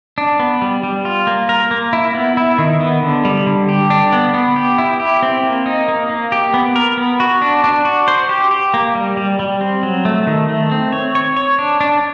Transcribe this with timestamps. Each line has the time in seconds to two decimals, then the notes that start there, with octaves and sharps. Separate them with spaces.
0.18 D4
0.40 B3
0.62 G3
0.83 G3
1.05 F4
1.27 A#3
1.49 A#4
1.71 A#3
1.93 E4
2.15 B3
2.37 E4
2.58 D#3
2.81 B3
3.03 D3
3.25 G3
3.47 D3
3.69 G4
3.90 D4
4.13 B3
4.34 B3
4.56 G4
4.78 E4
5.00 G4
5.23 C4
5.44 A#3
5.66 D#4
5.88 A#3
6.10 A#3
6.32 G4
6.54 B3
6.76 A#4
6.97 B3
7.20 F#4
7.42 D4
7.64 D4
7.85 F#4
8.08 C5
8.29 G4
8.51 G4
8.74 A#3
8.95 G3
9.17 G3
9.39 G3
9.61 C4
9.83 F#3
10.05 A3
10.27 D#3
10.49 A3
10.71 C4
10.92 C#5
11.15 C#5
11.37 C#5
11.59 D4
11.81 D4